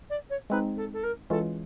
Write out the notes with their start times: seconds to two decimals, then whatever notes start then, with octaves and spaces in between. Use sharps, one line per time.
0.10 D5
0.30 C#5
0.50 G#3 C4 D#4 B4
0.77 A4
0.93 A4
1.03 A#4
1.30 E3 G#3 C#4 F4 A4